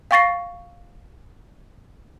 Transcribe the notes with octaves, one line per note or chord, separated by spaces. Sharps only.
F5 G5 C#6 A6 A#6 C7